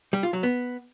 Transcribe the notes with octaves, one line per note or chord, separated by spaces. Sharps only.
G3
F4
F#3
B3